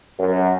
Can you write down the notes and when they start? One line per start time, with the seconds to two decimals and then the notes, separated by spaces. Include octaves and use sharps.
0.19 F#2